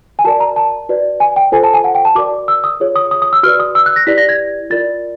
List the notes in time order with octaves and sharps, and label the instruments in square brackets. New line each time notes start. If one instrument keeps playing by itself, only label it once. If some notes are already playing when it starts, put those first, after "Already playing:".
[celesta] G#5
F#4 A#4 D5 A5
A#5
A5
F#4 B4 D5
G#5
G5
F4 A4 C5 G#5
A5
G#5
F#5
G5
A5
F#4 A#4 D5 D6
E6
D#6
F4 G#4 C#5
D#6
D#6
D#6
E6
F#4 B4 D5 F6
D#6
E6
F#6
A#6
E4 G4 B4 D5 B6
A#6
G#6
F4 A#4 D5 A6